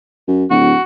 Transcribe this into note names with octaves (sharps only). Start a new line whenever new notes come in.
F#2
D1 F#4